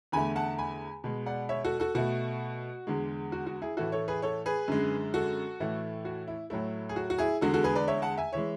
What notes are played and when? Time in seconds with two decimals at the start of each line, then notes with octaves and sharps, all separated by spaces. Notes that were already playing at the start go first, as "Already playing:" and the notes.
0.12 E2 D3 A3 G#5 B5
0.36 F#5 A5
0.58 G#5 B5
1.04 B2 G#3
1.26 D5 F#5
1.49 C#5 E5
1.65 F#4 A4
1.80 F#4 A4
1.95 B2 A3 F#4
2.87 E2 D3 G#3
3.32 F#4
3.46 F#4
3.62 E4 G#4
3.77 A2 E3 A3 F#4 A4
3.92 A4 C#5
4.08 G#4 B4
4.22 A4 C#5
4.46 G#4 B4
4.68 F#2 D3 G#3
5.14 F#4 A4
5.60 A2 E3 A3
6.05 F#4
6.28 E4
6.50 A2 F#3 A3 E4
6.89 G#4
6.96 F#4
7.10 F#4
7.18 E4 G#4
7.41 E2 D3 G#3 F#4 A4
7.54 F#4 A4
7.64 G#4 B4
7.75 B4 D5
7.88 C#5 E5
8.02 F#5 A5
8.17 E5 G#5
8.33 E3 G#3 C#5 E5